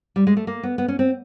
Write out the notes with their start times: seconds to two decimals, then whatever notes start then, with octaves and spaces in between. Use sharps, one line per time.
0.16 G3
0.27 G#3
0.37 A3
0.47 A#3
0.63 B3
0.78 B3
0.88 C#4
0.99 C4